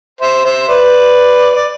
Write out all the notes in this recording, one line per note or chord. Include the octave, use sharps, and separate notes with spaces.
C5 E5
C5 E5
B4 D5
D5